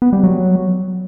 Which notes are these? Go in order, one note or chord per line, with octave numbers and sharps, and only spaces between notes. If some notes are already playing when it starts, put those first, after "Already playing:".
B3
G3
F#3